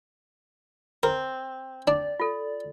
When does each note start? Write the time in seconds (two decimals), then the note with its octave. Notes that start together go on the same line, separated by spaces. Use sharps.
1.03 C4 A#4
1.87 D4 D5
2.20 F4 A4